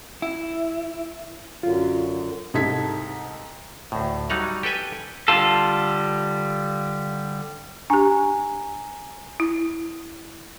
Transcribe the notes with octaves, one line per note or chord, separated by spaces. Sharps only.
E4
F#2 D3 F#3 F4
C2 G#2 A4 A5 G#6 B6
D2 A2
F#3 G3 D#4 F#5 A#5
G4 A4 B4 G5 G#5
D3 G3 F4 A4
D4 G4 G#5 A#5
E4